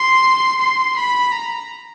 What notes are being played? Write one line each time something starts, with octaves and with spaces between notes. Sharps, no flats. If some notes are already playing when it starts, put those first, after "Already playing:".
Already playing: C6
C6
B5
A#5